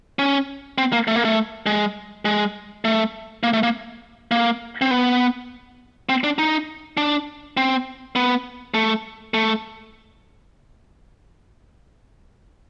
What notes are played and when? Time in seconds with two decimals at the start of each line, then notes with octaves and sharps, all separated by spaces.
0.19 C#4
0.78 C4
0.93 A#3
1.07 A3
1.16 A#3
1.25 A3
1.66 G#3
2.25 G#3
2.85 A3
3.43 A#3
3.53 A3
3.63 A#3
4.31 A#3
4.81 C4
4.91 B3
6.09 C4
6.24 D4
6.38 D#4
6.97 D4
7.57 C4
8.16 B3
8.74 A3
9.34 A3